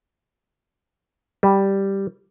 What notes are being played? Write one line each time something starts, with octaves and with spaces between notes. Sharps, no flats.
G3